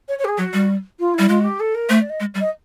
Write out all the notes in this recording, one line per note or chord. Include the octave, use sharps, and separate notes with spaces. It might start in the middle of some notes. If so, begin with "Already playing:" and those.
C#5
C#5
G4
G#4
F#3 F#4
G3
F4
G3 E4
G#3 F4
F#4
G4
A4
A#4
A3 C5
D5
D#5
G#3
G3
D#5